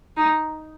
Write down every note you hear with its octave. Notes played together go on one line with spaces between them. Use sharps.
D#4